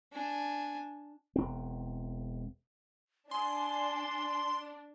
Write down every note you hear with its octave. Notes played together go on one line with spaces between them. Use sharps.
D4 G#5
E1 C4
D4 G#5 C6